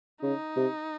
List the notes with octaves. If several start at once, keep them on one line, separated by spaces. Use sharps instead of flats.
C#3 D#4
C3